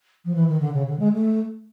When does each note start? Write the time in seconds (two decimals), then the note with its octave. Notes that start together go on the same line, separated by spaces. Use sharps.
0.25 F3
0.35 E3
0.48 D#3
0.60 D3
0.73 C#3
0.87 D3
0.99 G#3
1.12 A3